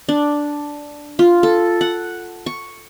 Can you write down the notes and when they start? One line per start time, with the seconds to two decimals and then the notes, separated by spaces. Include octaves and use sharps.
0.09 D4
1.19 F4
1.43 A4
1.81 F#5
2.46 C#6